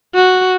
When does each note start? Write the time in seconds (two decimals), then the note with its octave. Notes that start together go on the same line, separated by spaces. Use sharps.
0.14 F#4